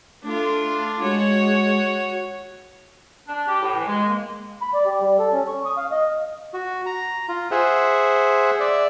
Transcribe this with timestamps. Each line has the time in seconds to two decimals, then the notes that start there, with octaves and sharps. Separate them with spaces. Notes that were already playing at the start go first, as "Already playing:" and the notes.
0.24 A3 D4 F4
1.02 G#3 F#4 C#5
3.28 D4
3.47 G4
3.62 A2
3.75 E3
3.87 G#3
4.06 A#3
4.62 B5
4.74 D5
4.85 G4
5.00 G3
5.19 A4
5.33 C#4
5.48 C#6
5.65 D#6
5.77 F5
5.91 D#5
6.54 F#4
6.86 A#5
7.29 F4
7.51 G#4 C5 E5 F#5
8.60 D5 E5